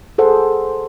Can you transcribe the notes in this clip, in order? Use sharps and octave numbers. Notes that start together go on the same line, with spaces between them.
G#4 A4 C5 F#5